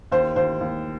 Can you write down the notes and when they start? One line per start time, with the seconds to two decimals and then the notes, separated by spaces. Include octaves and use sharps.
0.12 D#2 C5
0.36 D#2 C5
0.61 D#2